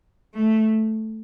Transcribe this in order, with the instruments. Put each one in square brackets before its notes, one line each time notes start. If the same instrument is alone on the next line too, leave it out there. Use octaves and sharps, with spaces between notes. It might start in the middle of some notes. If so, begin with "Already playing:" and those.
[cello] A3